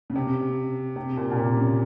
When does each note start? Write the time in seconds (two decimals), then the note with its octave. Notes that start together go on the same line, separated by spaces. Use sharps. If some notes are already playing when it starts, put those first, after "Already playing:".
0.10 C#3
0.15 C3
0.96 C3
1.17 A#2
1.32 A#2
1.37 C3
1.57 C#3